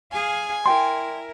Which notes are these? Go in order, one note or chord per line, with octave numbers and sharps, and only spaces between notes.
G#4 F5 G#5
E4 A#4 D5 G5 C6